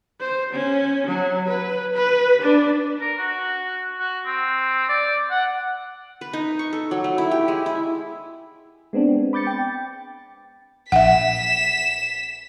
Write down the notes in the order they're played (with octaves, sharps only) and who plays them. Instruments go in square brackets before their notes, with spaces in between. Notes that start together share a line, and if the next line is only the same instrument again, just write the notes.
[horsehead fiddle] C5
C#4
F#3
B4
B4
D4
[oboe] A#4
F#4
F#4
C4
D5
F#5
[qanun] B4
D#4
C#6
A4
F#3
A3
E4
G4
G#3
E4
[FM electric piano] G#3 B3 C4 D4
B5 D6 G6 A6 C#7
G5 A6
[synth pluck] A#1 [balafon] E5 F#5 [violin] B6 E7